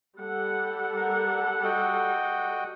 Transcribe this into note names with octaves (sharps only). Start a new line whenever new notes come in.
G3 A4 F#5
A#4
F#4 D#5 G5